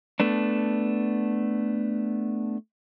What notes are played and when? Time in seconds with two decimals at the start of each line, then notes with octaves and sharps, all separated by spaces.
0.20 A3 B3 D4